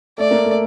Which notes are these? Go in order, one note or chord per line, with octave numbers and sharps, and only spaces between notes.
A3 D5
A#3
A3